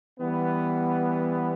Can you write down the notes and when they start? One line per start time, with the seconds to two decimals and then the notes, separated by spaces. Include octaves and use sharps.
0.20 E3 G3 B3